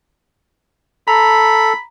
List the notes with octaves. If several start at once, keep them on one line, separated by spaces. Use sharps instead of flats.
A4 A#5 B5